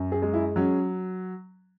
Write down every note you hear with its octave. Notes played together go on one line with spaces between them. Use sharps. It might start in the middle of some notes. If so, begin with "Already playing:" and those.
Already playing: F#2
G#4
G#3
E4
F#3 C#4